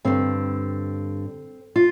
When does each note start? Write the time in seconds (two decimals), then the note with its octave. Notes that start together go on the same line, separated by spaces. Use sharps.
0.05 G2 D3 C4
1.76 F4